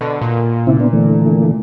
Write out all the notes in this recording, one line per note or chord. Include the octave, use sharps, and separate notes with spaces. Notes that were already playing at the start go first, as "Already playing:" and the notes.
B2 D3
A#2
C#3 C4 E4
B3 D4
D3 E3 A3